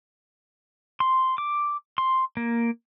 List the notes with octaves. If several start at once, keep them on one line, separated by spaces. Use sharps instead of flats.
C6
D6
C6
A#3